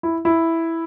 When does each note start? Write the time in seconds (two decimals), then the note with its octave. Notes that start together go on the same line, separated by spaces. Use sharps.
0.03 E4
0.25 E4